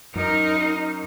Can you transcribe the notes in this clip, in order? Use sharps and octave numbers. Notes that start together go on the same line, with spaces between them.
F#2 D#4 A#4